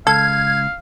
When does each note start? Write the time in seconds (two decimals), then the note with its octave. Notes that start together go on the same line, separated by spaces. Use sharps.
0.07 C#2 A4 F5 G#6